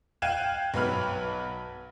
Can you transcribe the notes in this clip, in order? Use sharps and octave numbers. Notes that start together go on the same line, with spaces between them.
F5 G5 F#6 G#6 D#7 E7
B1 F#3 B4 B5 F6